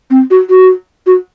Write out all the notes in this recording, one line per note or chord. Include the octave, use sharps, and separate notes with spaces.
C4
F#4
F#4
F#4